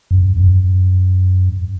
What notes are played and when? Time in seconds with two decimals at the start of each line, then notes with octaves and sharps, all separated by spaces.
0.11 F#2
0.37 F#2